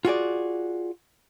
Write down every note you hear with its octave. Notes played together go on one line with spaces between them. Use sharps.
F4 F#4 G#4 D5